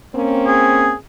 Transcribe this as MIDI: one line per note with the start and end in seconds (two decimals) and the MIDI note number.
0.14 0.93 58
0.14 0.93 60
0.14 0.93 61
0.47 0.94 68